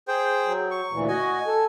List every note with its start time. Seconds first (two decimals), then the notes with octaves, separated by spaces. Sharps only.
0.08 G#4 C5 G5
0.46 F#3
0.71 C#6
0.92 D2 A#2 E3
1.08 F#4 D#5 G#5
1.47 A4